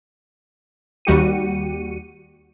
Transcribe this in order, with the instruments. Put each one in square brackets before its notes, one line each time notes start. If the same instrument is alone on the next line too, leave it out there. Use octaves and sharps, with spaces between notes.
[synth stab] D#2 G3 F#4 G4 C#7 D#7